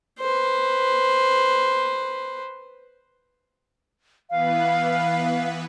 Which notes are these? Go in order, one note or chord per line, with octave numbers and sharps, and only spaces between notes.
B4 C5
E3 B3 B4 F5